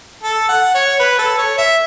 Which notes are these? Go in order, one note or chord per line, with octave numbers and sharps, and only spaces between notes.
A4
F#5
C#5
B4
A4
C#5
E5